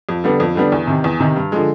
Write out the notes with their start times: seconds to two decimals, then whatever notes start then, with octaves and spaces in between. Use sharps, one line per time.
0.09 F2
0.24 D3 G3 B3 D4
0.40 F2
0.55 D3 G3 B3 D4
0.72 E2
0.87 C3 D#3
1.04 E2
1.20 C3 D#3
1.36 G2
1.52 D3 F3 G#3